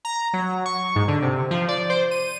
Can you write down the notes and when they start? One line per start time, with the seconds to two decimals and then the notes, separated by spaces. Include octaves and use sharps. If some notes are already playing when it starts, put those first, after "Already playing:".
0.05 A#5
0.33 F#3
0.65 C#6
0.96 G#2
1.08 D3
1.22 C3
1.51 F3
1.68 D5
1.90 C5
2.11 D#7